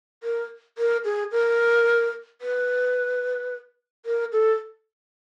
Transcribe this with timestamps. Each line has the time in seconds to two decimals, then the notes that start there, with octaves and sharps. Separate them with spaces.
0.23 A#4
0.78 A#4
1.05 G#4
1.32 A#4
2.41 B4
4.06 A#4
4.32 A4